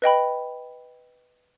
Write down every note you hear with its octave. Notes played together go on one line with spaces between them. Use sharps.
B4 D#5 G5 B5